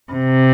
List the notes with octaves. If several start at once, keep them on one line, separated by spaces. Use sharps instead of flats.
C3